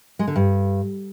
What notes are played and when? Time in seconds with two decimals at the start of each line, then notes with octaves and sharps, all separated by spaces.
0.19 G#3
0.27 D3
0.36 G2